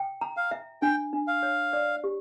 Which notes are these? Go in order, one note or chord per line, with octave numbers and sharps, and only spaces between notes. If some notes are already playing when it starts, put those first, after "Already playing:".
Already playing: G5
A#5
F5
E5
D4 G5
D4
F5
C#5
D5
G4